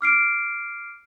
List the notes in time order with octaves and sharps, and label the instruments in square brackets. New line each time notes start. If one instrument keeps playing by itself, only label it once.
[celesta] D6 F6 C7 D7